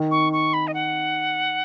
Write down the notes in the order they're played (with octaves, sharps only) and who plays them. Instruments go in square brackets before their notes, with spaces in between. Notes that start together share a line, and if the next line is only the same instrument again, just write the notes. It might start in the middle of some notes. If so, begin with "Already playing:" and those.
Already playing: [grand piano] D#3
[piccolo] C#6
C#6
B5
D#5
F#5